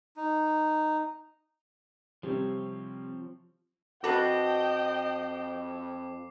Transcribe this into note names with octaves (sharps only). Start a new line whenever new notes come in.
D#4
C3 F3 G3 C4 C#5
F2 F#4 A4 B4 D#5 G5 D6 C7